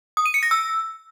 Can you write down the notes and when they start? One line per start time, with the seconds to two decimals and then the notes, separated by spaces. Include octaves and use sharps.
0.17 D#6
0.26 D#7
0.34 C#7
0.43 A#6
0.51 E6